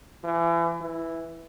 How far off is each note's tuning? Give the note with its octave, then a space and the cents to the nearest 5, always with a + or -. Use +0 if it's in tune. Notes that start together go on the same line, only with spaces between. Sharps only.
E3 +30
E3 +0